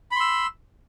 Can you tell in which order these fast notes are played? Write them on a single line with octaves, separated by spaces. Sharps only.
B5 C6 E6